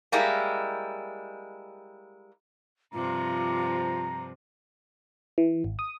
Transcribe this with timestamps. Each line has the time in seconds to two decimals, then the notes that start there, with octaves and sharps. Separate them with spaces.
0.12 G3 G#3 A#3 E4
2.94 G2 C3 F3 F4 A#5
5.38 E3
5.64 G#1
5.79 D#6